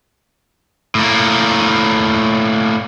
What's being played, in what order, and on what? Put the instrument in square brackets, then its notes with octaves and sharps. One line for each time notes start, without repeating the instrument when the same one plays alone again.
[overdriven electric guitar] A2 A#3